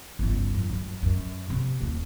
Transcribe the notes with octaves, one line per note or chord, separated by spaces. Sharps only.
G1 C#2
F#2
F#2
F#2
C3
D#1 A#3